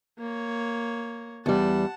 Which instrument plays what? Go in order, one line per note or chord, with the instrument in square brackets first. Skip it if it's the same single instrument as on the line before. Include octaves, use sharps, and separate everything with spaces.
[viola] A#3 C#5
[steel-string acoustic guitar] E2 G3 [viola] F#5 A5